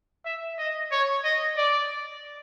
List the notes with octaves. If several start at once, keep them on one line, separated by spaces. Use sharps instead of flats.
E5
D#5
C#5
D#5
D5